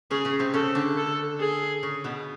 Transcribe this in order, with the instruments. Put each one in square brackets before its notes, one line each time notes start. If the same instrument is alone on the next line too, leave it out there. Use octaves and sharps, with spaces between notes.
[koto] C#3 C#4 [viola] G#4
[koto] C#3 C#4
C3 C4
[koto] C#3 C#4 [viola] A4
[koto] D3 D4
[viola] A4
G#4
[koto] C#3 C#4
B2 B3